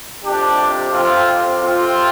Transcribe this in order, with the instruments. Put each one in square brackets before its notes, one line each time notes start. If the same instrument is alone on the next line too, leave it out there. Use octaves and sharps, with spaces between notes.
[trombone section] F2 C3 D4 G4
C4 F4
C4 F4